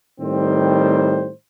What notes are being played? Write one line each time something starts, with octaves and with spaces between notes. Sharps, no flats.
A2 D#3 G3 C4 C5